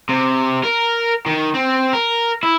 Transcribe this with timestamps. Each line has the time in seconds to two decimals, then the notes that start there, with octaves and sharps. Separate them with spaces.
0.09 C3
0.63 A#4
1.26 D#3
1.54 C4
1.93 A#4
2.43 E4